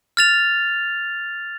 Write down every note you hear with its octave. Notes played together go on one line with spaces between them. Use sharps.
F6 A6 F7